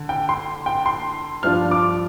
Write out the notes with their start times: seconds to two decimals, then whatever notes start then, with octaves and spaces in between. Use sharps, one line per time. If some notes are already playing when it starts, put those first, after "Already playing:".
Already playing: D3
0.09 G5
0.29 C6
0.66 G5
0.86 C6
1.43 G2 F3 D4 F4 F6
1.71 D6